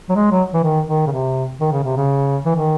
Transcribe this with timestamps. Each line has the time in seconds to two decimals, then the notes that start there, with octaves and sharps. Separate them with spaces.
0.09 F#3
0.15 G#3
0.31 F#3
0.53 E3
0.63 D#3
0.87 D#3
1.07 C#3
1.11 C3
1.60 D#3
1.72 C#3
1.84 C3
1.96 C#3
2.45 E3
2.55 D#3